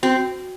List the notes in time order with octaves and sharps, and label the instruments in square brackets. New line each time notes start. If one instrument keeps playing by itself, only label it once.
[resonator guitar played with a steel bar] C4 [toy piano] F#4